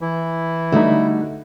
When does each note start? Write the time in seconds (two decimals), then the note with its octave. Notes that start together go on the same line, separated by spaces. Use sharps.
0.01 E3 E4
0.72 D3 G3 A3 D#4 F#4